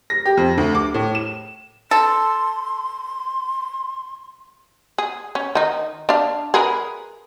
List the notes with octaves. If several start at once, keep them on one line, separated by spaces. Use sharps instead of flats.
A#6
G4
F2
D2
D6
A2
E7
A4 C6
G#4
C#4
D#3 D#4
D4 F5
G#4 A#4 B4